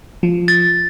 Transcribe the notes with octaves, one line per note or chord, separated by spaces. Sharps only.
F3
A6